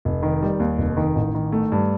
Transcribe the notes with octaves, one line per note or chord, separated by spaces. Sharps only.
F1
D#3
G3
D#2
F1
D#3
A1
D#3
A3
G2